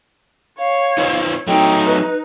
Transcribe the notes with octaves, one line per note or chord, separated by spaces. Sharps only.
C#5 F5
D#4 B4 C5
F#3 A3 D#4 G5
B4